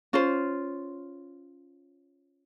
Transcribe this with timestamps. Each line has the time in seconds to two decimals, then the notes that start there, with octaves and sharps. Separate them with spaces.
0.13 C#4 F4 C5